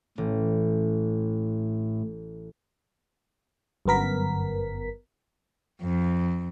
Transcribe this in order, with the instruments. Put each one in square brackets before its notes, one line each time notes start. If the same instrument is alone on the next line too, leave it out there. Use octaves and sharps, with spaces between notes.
[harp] A1 [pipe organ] A2
[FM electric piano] G1 F#2 B3 A#4 B6
[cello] F2